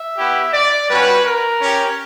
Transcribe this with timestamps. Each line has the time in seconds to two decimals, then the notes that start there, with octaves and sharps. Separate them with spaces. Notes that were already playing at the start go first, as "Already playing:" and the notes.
Already playing: E5
0.18 B3 E4 G4
0.54 D5
0.90 G3 C#4 F#4 B4
1.25 A#4
1.61 C#4 G4